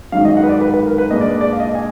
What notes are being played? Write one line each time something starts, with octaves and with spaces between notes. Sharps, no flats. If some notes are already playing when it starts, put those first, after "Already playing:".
G#2 D#3 F#3 F5
D#5
F#5
B4
D5
B4
B4
A#4
B4
A#2 G#3 D4 D#5
D5
B4
D5
F5
D#5
G#5